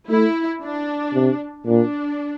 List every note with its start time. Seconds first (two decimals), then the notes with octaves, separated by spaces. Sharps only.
0.10 A3 E4
0.63 D4
1.14 C3
1.66 A#2 D4